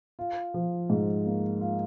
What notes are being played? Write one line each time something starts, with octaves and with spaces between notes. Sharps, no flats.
F4
F3
G#2
A#3
F4